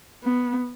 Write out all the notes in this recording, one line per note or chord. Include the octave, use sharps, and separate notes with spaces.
B3